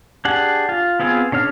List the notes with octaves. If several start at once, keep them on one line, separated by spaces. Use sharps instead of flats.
D4 G4 G#4 F#5
F4
B3 C4 F4 G#4
C#3 D4 C#5 F6